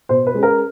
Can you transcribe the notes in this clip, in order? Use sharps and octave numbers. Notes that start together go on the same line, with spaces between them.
B2 C5
B4
G#3 C#4
A#4